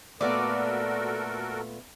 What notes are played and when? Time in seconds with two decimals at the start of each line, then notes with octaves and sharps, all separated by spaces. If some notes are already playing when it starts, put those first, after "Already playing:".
0.21 A#2 A3 B3 F#4 A4 A#4 D5